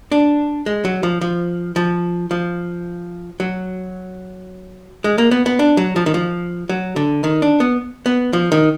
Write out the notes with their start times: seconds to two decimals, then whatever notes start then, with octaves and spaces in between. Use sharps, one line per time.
0.12 D4
0.66 G#3
0.85 F#3
1.03 F3
1.21 F3
1.76 F3
2.31 F3
3.40 F#3
5.04 G#3
5.18 A#3
5.31 B3
5.46 B3
5.59 D4
5.77 F#3
5.96 F3
6.06 D#3
6.14 F3
6.69 F#3
6.96 D3
7.24 D#3
7.42 D4
7.60 B3
8.06 B3
8.33 F3
8.52 D#3